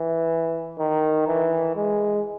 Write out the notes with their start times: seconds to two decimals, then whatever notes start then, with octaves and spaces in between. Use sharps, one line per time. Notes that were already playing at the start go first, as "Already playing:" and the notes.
Already playing: E3
0.79 D#3
1.27 E3
1.76 G#3